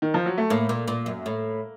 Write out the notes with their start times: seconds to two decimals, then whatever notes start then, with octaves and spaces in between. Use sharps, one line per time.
0.02 D#3
0.14 F3
0.26 F#3
0.38 A3
0.50 A2 A#3
0.69 A#2
0.88 A#2
1.06 F#2
1.26 A2